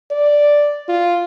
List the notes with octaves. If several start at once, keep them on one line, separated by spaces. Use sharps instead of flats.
D5
F4